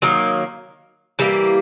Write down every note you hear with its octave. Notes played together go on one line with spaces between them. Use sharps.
D#3 F#3 A#3
E3 G3 A#3